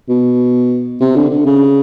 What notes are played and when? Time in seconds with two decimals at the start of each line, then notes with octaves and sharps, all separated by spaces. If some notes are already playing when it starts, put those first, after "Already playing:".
0.09 B2
1.01 C3
1.16 D3
1.30 D3
1.46 C#3